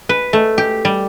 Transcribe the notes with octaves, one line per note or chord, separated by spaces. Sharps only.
B4
A3
G4
G3